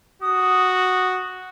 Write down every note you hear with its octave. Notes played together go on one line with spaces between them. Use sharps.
F#4 D#6